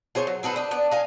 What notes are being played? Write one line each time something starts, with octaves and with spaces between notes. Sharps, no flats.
F4 G#4 C5 C#5
F#3
C4 G#4 A4 B4
D4 D#4
B3 D4
D#5 F5 G#5